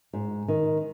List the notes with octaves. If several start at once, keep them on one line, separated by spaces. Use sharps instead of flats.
G#2
D#3